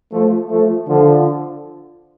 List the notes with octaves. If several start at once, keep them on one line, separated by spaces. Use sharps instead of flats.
F3 A3
F3 A3
D3 F3